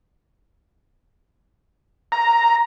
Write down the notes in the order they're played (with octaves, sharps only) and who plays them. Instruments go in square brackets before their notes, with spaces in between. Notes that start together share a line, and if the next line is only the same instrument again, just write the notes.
[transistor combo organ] A#5